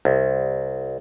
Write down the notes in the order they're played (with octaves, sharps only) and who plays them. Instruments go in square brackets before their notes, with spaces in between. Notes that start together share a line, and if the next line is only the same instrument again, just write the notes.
[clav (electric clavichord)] C2